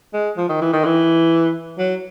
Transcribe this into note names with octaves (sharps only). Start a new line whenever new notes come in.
G#3
F3
D#3
E3
D#3
E3
F#3